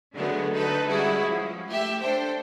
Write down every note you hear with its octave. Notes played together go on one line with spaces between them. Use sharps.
D3 F#3 G#3 A3 B3
D3 A3 D#4 A4 B4
G3 G#3 C#4 E4 F#4 G#4
F3
A3 G4 E5
D4 A4 C5 G5